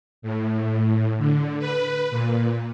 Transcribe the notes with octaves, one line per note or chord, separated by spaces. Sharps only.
A2
D3
B4
A#2